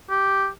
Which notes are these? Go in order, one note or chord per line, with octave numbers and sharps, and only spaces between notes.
G4